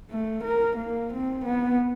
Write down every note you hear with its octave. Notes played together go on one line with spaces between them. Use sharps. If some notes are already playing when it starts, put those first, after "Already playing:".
A3
A#4
A#3
C4
B3